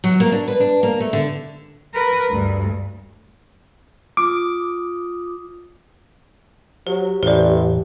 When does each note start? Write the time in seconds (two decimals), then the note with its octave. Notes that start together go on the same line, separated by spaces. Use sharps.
0.04 F#3
0.20 A#3
0.32 D4
0.48 B4
0.60 D4
0.83 A#3
1.00 A3
1.13 D3
1.94 A#4 B4
2.29 D2 G2
4.17 F4 D6 D#6
6.87 F#3 G4 C5
7.23 A1 E2 A2 E3 C5 D5